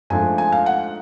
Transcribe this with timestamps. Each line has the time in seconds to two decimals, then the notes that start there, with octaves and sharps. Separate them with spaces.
0.10 G#2 F3 A3 D4 G#5
0.38 G#5
0.52 F5
0.66 F#5